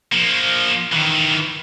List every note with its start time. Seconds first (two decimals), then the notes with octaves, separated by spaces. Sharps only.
0.12 F3 A#3
0.93 D#3 E3